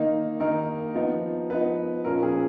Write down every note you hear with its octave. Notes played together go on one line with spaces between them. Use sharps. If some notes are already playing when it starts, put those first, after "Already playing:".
Already playing: D#3 A#3 D#4
D#3 A#3 D#4 A#4
F3 B3 D#4
F3 B3 D#4 B4
A#2 F3 A#3 C#4 A#4
G#4